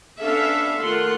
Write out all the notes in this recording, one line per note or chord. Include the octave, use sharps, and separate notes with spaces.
B3 C#4 D4 A4 E5 F5
D#3 A3 F4 F#5 C6